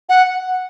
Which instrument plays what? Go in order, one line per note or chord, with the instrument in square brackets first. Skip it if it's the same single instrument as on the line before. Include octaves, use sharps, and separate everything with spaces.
[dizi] F#5